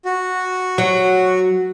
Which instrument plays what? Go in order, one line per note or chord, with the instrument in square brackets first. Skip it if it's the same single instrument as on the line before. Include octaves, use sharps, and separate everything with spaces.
[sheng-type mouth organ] F#4
[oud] F#3